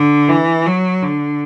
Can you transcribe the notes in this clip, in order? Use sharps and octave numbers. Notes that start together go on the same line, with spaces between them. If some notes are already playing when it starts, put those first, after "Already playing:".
Already playing: D3
E3
F#3
D3